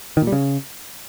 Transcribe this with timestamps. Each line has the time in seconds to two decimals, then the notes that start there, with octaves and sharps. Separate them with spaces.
0.17 D#3
0.22 A#2
0.27 G3
0.32 C#3